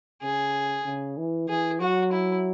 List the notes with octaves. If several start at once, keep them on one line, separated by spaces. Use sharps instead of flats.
C#3 G#4
C#3
E3
E3 G#4
F#3 F#4
E4